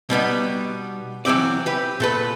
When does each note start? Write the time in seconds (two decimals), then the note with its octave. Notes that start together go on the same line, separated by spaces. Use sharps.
0.10 B2 G3 B3 D#4
1.25 E3 F#3 A#3 C4 D5
1.66 G4 B4
2.00 A#2 A4 B4